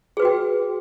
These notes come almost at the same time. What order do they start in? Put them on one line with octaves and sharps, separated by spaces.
G#4 B4 F#4 G5